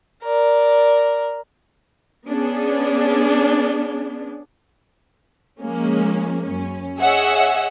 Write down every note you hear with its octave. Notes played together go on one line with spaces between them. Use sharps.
A#4 D5
B3 C#4 D4 G#4
F3 G#3 A#3 C#4
F#2 C#4
G#4 C#5 D#5 E5 F#5 E6